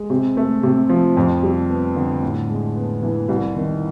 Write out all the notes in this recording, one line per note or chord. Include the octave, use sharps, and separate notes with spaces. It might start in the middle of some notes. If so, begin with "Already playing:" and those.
Already playing: G#3
C3
A3
C3
F3
F2
G3
B3
D3
A2
G#3
B3
E3
C2
D#3